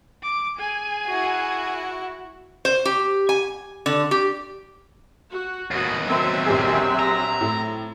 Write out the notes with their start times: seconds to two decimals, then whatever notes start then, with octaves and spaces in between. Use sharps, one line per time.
0.23 D6
0.58 G#4 G#5
1.06 E4 F#4
2.65 C5
2.85 G4
3.29 G#5
3.86 D3
4.11 G4
5.30 F#4
5.71 D#2 B2 F#4 D#5
6.07 F#3 C4 E5
6.46 A#1 G4 G#4
6.99 A#5
7.41 A2